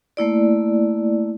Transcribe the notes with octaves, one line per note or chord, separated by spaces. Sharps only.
A3 A#3 E4 D5